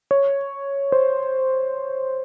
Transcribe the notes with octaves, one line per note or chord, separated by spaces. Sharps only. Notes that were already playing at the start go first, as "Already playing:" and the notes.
C#5
C5